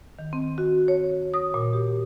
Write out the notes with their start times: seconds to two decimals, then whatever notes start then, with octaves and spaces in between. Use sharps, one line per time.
0.19 D#3
0.33 C4
0.58 F#4
0.88 C#5
1.34 D#6
1.54 A#2
1.73 G4